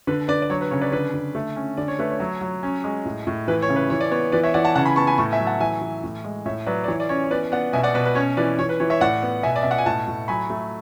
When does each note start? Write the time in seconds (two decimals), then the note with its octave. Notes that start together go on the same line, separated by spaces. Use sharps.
0.07 D3 B4
0.28 D3 B4 D5
0.42 D5
0.50 F#3 C#5
0.61 B4
0.71 C#3 C#5
0.81 B4 D5
0.92 D3 B4 D5
1.14 D3
1.35 A3
1.56 C#4
1.77 D3 D5
1.88 C#5
1.99 A3 B4
2.11 C#5
2.20 F#3
2.41 F#3
2.63 C#4
2.84 G#3
3.05 A2
3.27 A2
3.48 E3 B4
3.62 C#5
3.69 C#3
3.76 B4
3.90 E3 C#5
4.01 D5
4.11 B3 C#5
4.32 E3 B4 D5
4.43 C#5 E5
4.54 E3 D5 F#5
4.64 F#5 A5
4.75 C#3 F#5 A5
4.86 G#5 B5
4.96 B3 A5 C#6
5.07 G#5 B5
5.18 A2 A5 C#6
5.32 E5 G#5
5.39 F#3
5.46 F#5 A5
5.60 E3 E5 G#5
5.81 E3
6.04 A2
6.24 G#3
6.45 A2 C#5 E5
6.66 F#3 B4 D5
6.84 D5
6.88 E3 C#5
7.00 D5
7.09 C#4 C#5
7.24 C#5
7.31 B3 B4 D5
7.52 B3 D5 F#5
7.73 B2 E5 G#5
7.83 D5 F#5
7.94 B2 B4
8.05 B4
8.15 C#4 C#5
8.37 E3 B4 D5
8.59 E3 C#5
8.69 B4
8.80 E3 C#5
8.90 C#5 E5
9.01 A2 D5 F#5
9.23 B3
9.43 B2 E5 G#5
9.56 D5
9.63 B2 E5
9.71 F#5
9.78 G#5
9.86 A2 F#5 A5
10.07 A2
10.28 F#3 G#5 B5
10.50 A3